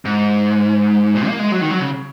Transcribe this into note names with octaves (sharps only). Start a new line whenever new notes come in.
G#2
A#2
A#3
G#3
F#3
D#3
F#3
C#3